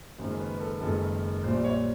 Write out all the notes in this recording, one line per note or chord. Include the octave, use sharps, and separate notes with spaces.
F#1 F#2 D#3 G#3 C5
B4
A4
F#1 F#2 D#3 G#3 A4
A#1 A#2 G3 C5
C#5